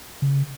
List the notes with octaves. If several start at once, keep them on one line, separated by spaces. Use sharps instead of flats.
C#3